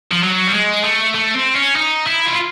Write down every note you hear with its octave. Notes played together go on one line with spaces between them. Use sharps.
F3
F#3
G3
G#3
A3
A3
C4
C#4
D#4
E4
F4